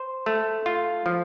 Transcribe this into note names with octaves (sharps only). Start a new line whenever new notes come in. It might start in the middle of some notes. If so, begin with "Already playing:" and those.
Already playing: C5
A3
F4
F3